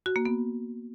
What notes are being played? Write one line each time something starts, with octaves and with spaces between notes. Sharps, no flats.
F#4
A#3
B3